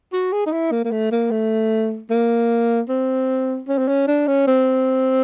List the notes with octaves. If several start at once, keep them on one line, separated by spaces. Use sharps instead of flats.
F#4
G#4
D#4
E4
A#3
A#3
A3
A#3
A3
A#3
C4
C#4
C4
C#4
D4
C#4
C4